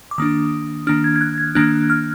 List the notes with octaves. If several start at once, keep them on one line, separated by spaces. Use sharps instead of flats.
D6
D#3 A#3 D4 D#6
D#3 A#3 D4 F6
G#6
G#6
F#6
G#6
D#3 A#3 D4 F#6
F6